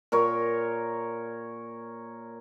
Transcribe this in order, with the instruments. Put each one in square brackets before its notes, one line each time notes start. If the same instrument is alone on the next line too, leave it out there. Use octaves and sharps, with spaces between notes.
[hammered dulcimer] A#2 A#4 C#5